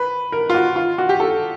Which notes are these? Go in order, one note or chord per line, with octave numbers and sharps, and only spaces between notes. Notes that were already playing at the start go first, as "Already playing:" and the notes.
Already playing: B4
A#4
F4
F#4
F4
F#4
G4
A4